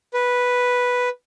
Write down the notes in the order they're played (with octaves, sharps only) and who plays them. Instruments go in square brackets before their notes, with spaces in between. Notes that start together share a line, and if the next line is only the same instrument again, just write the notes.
[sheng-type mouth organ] B4